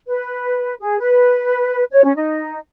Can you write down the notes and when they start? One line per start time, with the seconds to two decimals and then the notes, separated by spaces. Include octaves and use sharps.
0.08 B4
0.81 G#4
1.00 B4
1.92 C#5
2.04 C#4
2.16 D#4